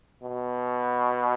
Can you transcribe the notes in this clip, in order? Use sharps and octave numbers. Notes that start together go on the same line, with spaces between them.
B2